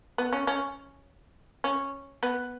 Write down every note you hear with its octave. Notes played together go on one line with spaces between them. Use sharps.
B3
C#4
C#4
C#4
B3